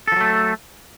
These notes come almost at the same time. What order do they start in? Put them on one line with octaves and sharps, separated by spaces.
A4 F3 F#3 A3